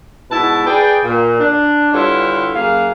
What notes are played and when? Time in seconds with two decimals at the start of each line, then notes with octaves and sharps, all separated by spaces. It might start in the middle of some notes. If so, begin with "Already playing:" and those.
0.30 G#2 B2 E4 B4 A5
0.65 G#4 B4 D5 G5
1.03 A#2
1.39 D4
1.93 D3 G3 E4 F4 B4 C#5
2.54 F#2 A#3 G#4 F5